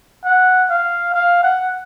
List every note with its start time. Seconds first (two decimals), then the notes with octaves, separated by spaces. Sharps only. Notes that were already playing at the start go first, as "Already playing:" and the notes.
0.25 F#5
0.70 F5
1.14 F5
1.43 F#5